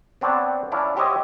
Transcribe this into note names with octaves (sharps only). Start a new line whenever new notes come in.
B3 C4 D4 C#5 F#5 A5
C#4 D4 E4 F5
F#4 G4 C5 C#5 D#5 E5